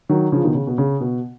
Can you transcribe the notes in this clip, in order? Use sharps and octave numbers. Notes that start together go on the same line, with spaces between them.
D#3 F#3
C#3 F3
B2 D#3
C#3
B2
C#3
B2